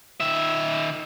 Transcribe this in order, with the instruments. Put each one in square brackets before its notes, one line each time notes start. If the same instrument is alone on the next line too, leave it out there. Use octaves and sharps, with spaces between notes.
[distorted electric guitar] D#3 E5